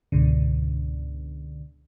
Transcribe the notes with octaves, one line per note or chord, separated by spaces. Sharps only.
C#2 G#2 B2 D3